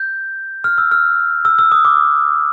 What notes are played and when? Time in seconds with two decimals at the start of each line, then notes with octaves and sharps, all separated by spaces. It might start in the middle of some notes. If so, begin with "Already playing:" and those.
Already playing: G6
0.64 F6
0.78 E6
0.92 F6
1.45 E6
1.59 E6
1.72 D#6
1.85 D6